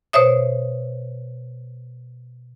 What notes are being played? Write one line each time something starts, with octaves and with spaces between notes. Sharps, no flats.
B2 C5 C#5 E5 D#6